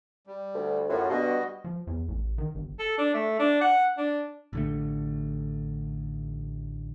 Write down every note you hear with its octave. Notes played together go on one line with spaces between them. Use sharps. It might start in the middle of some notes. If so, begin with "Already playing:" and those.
G3
D2
F#2 A2 F4 F#4
G2 B2 G3 F#4 D#5
F3
E2
A1
D#3
G1
A4
D4
A3
D4
F#5
D4
A1 D3 A3